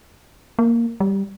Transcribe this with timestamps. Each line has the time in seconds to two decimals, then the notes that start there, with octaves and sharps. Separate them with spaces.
0.59 A#3
1.00 G3